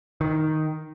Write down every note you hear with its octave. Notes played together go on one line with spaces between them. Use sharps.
D#3